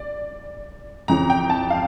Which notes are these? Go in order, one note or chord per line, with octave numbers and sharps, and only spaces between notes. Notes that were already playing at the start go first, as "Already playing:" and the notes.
Already playing: D5
F2 C#3 E3 A#5
G5
A5
F5